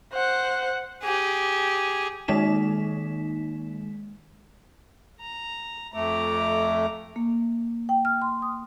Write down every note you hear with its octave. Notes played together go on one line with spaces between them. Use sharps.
C5 F#5
G4 G#4
D#3 G#3 A#3 D#4 B6 E7
A#5
F2 A3 A#5 D6
A#3
G5
F6
C6
D#6